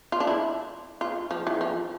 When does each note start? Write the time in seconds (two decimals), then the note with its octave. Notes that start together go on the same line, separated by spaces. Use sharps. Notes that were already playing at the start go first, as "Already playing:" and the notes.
0.12 F4
0.20 D4
0.27 E4
1.01 F4
1.31 F3
1.47 E3
1.61 F3